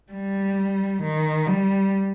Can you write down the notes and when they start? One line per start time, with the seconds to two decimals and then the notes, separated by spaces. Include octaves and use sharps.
0.13 G3
1.03 D#3
1.48 G3